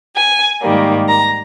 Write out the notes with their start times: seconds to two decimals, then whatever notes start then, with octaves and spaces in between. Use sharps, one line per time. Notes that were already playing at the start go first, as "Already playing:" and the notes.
0.14 G#5
0.61 G#2 D#3 G3 A#3
1.08 A#5